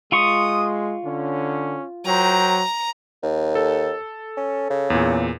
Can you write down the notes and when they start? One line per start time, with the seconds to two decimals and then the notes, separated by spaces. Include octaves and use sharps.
0.12 G#3 F4 C6 C#6 D#6
1.05 D3 C#4
2.06 F#3 A#4 C5 G5 A#5
3.23 D#2
3.55 A4
4.37 C#4
4.70 C#3
4.90 E2 A#2